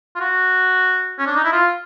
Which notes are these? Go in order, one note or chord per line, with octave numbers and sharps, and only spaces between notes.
F4
F#4
C#4
D4
D#4
E4
F4